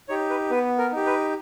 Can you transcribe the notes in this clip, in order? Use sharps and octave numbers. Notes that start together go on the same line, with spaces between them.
D#4 G4 C#5
B4
B3 B4
A#4
D#4 G4
B4